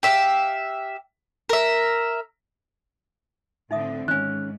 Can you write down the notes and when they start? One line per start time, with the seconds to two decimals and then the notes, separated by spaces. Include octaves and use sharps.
0.03 G4 E5 F5
1.49 A#4 E5
3.71 A2 D3 C4 D#4 E5 D#6
4.08 G#2 D#3 C#4 C#5 G#5 F#6